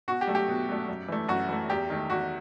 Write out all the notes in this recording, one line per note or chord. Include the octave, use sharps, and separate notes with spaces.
B2 F#4
G4
F#3 A3
G4
B2
F#3 A3
F#2
E3 A3
F#2 F#4
E3 A3
E2 G4
D#3 A3
E2 F#4